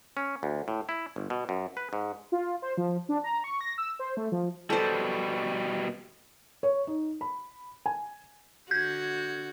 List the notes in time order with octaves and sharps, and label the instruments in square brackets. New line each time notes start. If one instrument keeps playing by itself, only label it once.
[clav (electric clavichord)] C#4
D2
A2
E4
G1
B2
F#2
B4
G#2
[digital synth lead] F4
C5
F3
D4
A#5
C#6
A#6
E6
C5
A3
F3
[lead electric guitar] B2 G3 [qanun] A4 C5
[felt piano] C#5
D#4
B5
G#5
[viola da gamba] D3 F#4 [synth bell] G6 G#6